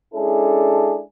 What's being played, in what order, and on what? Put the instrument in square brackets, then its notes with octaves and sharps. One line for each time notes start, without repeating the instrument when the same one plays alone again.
[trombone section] G#3 C#4 D4 E4 G#4 A4